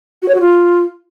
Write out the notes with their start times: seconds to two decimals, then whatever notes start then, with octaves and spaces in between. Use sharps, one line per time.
0.22 F#4
0.28 C#5
0.34 F#4
0.40 F4